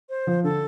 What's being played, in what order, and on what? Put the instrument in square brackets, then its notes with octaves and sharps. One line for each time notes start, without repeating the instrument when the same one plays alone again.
[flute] C5
[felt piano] F3
[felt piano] D3 [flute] A4